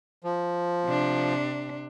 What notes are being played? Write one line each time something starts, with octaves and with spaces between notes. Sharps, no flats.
F3
C3 D4